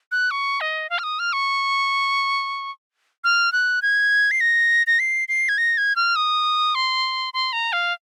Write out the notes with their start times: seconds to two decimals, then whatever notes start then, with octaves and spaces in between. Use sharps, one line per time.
0.12 F#6
0.31 C#6
0.61 D#5
0.90 F5
0.99 F6
1.03 D#6
1.19 F6
1.33 C#6
3.24 F6
3.52 F#6
3.82 G#6
4.31 C7
4.40 A#6
4.87 A#6
4.99 C7
5.28 C7
5.49 G#6
5.58 A#6
5.77 G#6
5.96 F6
6.16 D#6
6.75 C6
7.34 C6
7.53 A#5
7.73 F5